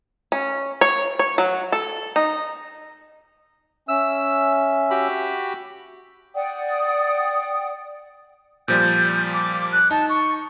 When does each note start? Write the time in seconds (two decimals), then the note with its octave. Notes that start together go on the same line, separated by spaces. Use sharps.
0.32 C#4
0.81 C#5
1.19 C#5
1.38 F#3
1.72 A4
2.16 D#4
3.89 C#4 E5 E6
4.90 F#4 G4 B5
6.34 D5 F#5 G5 D#6
8.68 A#2 F3 G3 G6
9.34 D6
9.72 F#6
9.91 D#4 A5
10.09 C#6